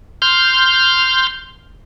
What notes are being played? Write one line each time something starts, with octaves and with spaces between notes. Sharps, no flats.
C6 F6 G6